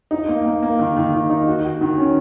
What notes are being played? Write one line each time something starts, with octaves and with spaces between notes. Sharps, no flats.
D#4
A#3
A#3
A#3
D#3
D#3
D#3
D#4
F#4
F#4
D#3
C#4